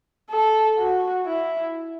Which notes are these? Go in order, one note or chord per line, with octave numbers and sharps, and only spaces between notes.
A4
F#4
E4